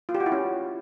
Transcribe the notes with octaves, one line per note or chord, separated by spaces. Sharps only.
F4
G4
F#4
E4
C#4